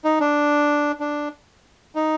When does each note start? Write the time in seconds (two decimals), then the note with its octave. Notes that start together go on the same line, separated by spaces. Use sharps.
0.04 D#4
0.20 D4
1.00 D4
1.95 D#4